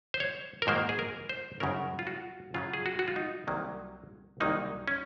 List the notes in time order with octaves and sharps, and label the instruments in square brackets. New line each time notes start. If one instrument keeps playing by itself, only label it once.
[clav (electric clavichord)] C5
C#5
A#4
G#2 D#3 F#3 A#3 C5
G#4
A#4
C5
F#2 C#3 F#3 C#4 A#4
F4
F#4
F#2 C#3 F#3 C#4 F4
G#4
F#4
F#4
F4
D#4
C2 C3 D#3 F#3 A#3
C2 C3 D#3 F#3 A#3 D#4
C#4